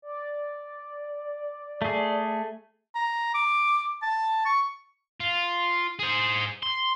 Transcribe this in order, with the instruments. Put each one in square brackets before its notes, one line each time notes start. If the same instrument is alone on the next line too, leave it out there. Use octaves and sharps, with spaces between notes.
[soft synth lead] D5
[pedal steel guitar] A3 G#4
[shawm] A#5
D6
A5
C#6
[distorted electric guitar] F4
G#4 C5
C6